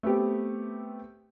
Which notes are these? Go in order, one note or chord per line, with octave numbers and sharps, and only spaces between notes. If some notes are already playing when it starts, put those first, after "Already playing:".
A3 B3 C4 G4